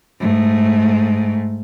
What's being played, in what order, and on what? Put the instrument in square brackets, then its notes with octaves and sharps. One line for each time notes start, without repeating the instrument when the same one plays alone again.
[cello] G#2 A3